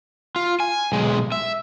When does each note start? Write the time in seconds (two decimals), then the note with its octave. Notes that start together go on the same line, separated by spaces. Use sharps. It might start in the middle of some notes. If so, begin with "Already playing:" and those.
0.36 F4
0.60 G#5
0.92 B1 G#3
1.32 E5